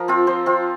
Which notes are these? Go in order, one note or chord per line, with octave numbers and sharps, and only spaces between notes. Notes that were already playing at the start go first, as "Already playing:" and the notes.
Already playing: F3 A#4
C4 F4
F3 C5
C4 F4